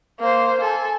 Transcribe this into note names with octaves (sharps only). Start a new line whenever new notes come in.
A#3 C5
A4 G#5